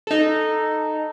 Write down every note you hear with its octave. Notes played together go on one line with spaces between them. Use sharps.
D#4 A4